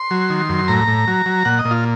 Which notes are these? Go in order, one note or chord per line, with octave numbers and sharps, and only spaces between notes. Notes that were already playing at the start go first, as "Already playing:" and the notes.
Already playing: C6
F#3
D#3
F#2
A2 A#5
A2
F#3
F#3
A#2 F#5
D#5
A#2
F4